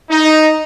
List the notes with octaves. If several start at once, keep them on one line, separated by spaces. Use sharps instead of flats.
D#4